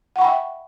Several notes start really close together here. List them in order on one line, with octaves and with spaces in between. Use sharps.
F#5 C#6 B5 G5 E5